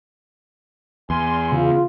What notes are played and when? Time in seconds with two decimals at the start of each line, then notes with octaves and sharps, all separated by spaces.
1.10 E2 G#5 C6
1.52 C#3 F4